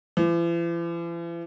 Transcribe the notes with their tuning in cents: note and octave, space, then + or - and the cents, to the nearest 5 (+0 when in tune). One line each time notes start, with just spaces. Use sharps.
E3 +45